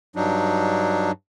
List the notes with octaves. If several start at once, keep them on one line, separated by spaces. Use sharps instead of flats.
G2 F#3 D4 D#4